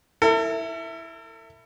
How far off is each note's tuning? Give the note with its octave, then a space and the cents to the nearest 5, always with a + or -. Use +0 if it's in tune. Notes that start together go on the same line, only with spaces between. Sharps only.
E4 +0 A4 +45